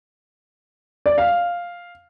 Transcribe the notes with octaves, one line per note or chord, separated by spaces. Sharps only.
D5
F5